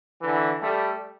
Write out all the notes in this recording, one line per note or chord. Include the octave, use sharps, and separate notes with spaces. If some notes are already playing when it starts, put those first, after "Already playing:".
D3 E3
G3 A3